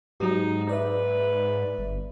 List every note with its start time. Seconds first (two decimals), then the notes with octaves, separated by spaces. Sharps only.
0.20 G#2 F#3 D#4 G4
0.69 B4 D5 E5
1.78 G1